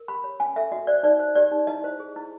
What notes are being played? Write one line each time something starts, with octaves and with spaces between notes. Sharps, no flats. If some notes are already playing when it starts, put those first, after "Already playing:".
Already playing: A#4
G4 B5
C#5
C#4 G#5
A4 E5
F#4 D#5
C5 D5
D#4 D5
C5
G4 D5
D#4
E4 D#5
C5
G#4
E4